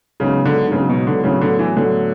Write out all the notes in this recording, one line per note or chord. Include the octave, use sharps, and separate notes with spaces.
G#2 C#3 F#3 B3
D3
G#2 C#3 F#3 B3
B2
D3
A2 C#3 F#3 B3 E4
D3
E3
A2 D3 F#3 B3 E4